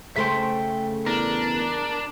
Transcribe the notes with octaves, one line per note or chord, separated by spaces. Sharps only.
C#3 A3 C5 E5 G5
E2 D4 A#4